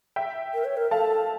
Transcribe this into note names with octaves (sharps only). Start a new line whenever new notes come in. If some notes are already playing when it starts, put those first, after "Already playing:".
E5 G5
A#4
C#5
A#4
A4 F5 A5